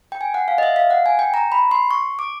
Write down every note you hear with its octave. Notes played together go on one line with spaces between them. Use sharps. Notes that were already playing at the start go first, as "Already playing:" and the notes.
G5
G#5
F#5
F5
D#5
E5
F5
F#5
G#5
G5
A#5
B5
C6
C#6
D6